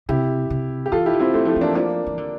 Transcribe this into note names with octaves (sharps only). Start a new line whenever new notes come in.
C3 E4 G4
C3
G4
E3 F4 A4
E4 G4
D3
C4 E4
E3 A3 C4
D3 F3 A3
E3
A#3 D4
F3 A#3 D4
E3
D3